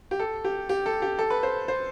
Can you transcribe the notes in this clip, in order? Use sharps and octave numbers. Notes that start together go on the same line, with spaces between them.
G4
A4
G4
G4
A4
G4
A4
B4
C5
C5